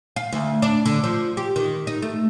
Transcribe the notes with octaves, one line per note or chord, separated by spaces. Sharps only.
F5
D2
D4
D3
F3
G4
D#3
D#4
A3